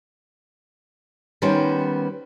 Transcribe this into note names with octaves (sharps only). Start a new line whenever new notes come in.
D#3 G3 B3 C#4 C5